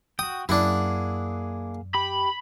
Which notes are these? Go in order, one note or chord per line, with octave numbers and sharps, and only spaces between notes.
F#4 G5 D#6
F#2 A#3 D4 E4 G#4 F#5
G4 B5